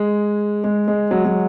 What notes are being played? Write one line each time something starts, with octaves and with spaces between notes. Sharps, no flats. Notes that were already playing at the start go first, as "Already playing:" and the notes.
Already playing: G#3
G#3
G#3
F#3
F#3